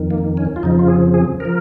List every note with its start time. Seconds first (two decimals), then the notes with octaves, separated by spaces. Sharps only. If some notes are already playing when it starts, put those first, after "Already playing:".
Already playing: F2 D#3
0.11 A#3
0.37 C#4
0.56 F4
0.63 F2 C#3 F3 D#4
0.79 F4
0.88 G#4
1.14 G#4
1.40 F3 A#4